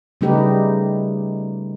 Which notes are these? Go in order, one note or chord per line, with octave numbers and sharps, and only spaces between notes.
C#3 G3 A3 D#4 G4 B4